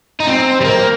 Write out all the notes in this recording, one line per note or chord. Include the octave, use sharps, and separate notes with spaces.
D#4
C4
G3
A#3